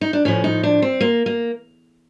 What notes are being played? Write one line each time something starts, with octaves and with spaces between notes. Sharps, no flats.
D#4
D4
A2 F3 C#4
D#4
D4
C4
A#3
A#3